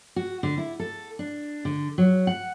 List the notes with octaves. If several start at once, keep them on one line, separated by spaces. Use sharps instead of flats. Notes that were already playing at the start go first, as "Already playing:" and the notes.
F#4
D3
E4
A4
D4
D3
F#3
F#5